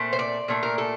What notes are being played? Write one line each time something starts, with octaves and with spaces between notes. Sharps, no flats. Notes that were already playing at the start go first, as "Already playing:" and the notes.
Already playing: A#2 A3 C4
C5
D5
A#2 A3 D4
A#4
A4